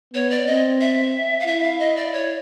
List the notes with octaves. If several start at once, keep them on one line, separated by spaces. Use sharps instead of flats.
B3 C#5
D5
C4 D#5
E5
F5
E4 E5
F5
D#5
D5
C#5